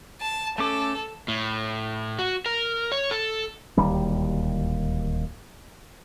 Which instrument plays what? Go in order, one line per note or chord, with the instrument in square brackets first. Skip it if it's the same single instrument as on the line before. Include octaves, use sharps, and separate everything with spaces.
[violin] A5
[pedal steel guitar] A3 C#4 D6 [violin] A4
[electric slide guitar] A2
F#4
A#4
C#5
A4
[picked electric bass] D1 D#2 G3